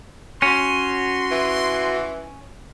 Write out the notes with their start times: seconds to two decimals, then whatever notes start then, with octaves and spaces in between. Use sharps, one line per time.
0.42 C#4 F#4 C6
1.31 E3